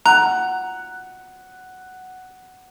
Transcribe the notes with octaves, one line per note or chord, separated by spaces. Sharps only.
F#5 A#5